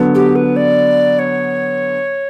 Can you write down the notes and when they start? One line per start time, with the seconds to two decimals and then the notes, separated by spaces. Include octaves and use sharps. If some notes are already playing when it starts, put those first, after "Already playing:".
Already playing: D3 F#3 B3
0.15 G4
0.36 B4
0.56 D5
1.19 C#5